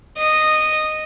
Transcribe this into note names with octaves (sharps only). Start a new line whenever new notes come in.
D#5